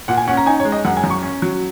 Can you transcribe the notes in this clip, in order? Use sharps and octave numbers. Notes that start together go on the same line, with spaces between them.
A#2 F#5
G#5
C#4 F#5
A#5
D#4 G#5
C#5
G#3
D#5
F#2 F#5
G#5
F#2
C#6
C#4
F#3